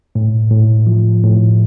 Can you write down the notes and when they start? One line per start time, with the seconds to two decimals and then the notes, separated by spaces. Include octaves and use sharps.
0.15 A2
0.51 A2
0.87 F3
1.23 A2